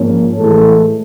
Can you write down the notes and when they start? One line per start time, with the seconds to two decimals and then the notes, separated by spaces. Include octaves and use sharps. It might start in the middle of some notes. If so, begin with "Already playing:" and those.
Already playing: G#2 F3 A#3 C#4
0.37 A2 E3 G#3 A4